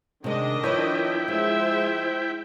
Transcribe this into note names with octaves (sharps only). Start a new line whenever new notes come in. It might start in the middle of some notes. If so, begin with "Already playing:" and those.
C3 D#3 G#3 D4 D#5
F3 E4 B4 C#5 G5
F3 G#3 C5 E5